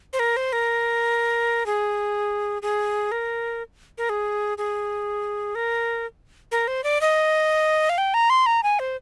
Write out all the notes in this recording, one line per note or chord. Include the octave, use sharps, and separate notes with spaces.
C5
A#4
C5
A#4
G#4
G#4
A#4
A#4
G#4
G#4
A#4
A#4
C5
D5
D#5
F5
G5
A#5
C6
A#5
G#5
C5